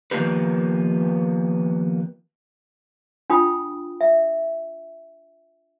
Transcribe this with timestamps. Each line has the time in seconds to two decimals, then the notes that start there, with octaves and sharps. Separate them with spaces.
0.11 D#3 F3 A#3 B3 G4 B4
3.30 D4 F4 G5 B5 D#6
4.01 E5